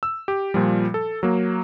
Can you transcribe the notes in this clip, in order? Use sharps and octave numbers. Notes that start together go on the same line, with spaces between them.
E6
G4
A#2 F3 G3
A4
F#3 A#3